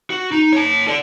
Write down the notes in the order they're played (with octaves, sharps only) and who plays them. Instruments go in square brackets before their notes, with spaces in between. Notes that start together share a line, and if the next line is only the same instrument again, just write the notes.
[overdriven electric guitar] F#4
D#4
C#5 A5
A4 D5